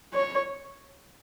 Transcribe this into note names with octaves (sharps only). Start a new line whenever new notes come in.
C#5